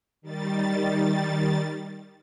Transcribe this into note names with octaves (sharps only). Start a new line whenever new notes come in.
D#3 G3 A6